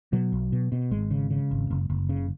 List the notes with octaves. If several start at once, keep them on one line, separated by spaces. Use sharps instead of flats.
B2 F#3
B1
B2
B2
G#1 G#3
C#3
C#3
G#1
F#1
F#1
C#3